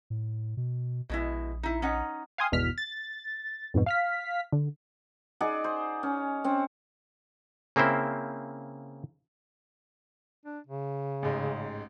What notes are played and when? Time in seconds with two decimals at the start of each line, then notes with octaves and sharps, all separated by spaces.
0.10 A2
0.57 B2
1.09 A#1 B2 G#3 E4
1.63 D#4 E4
1.82 C#4 D#4 F#5
2.38 F5 G5 G#5 C6 D#6
2.52 G#1 E2 B2 F6 B6
2.78 A6
3.74 F2 G#2 B2
3.86 F5 F6 B6
4.52 D3
5.40 D#4 G#4 D5 F#5
5.64 C5
6.03 C#4
6.44 C4 C#4
7.76 C#3 A#3 C4 E4 C5
10.45 D4
10.67 C#3
11.23 A1 G#2